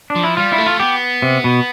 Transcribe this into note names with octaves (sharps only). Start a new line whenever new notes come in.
D4
F3
E4
G3 F4
E4
A3
F4
B3 G4
C3
B2